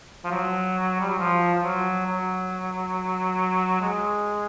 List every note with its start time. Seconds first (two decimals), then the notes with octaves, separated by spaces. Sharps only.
0.24 F3
0.31 F#3
1.00 G3
1.10 F#3
1.18 F3
1.54 F3
1.63 F#3
2.06 F#3
3.81 G#3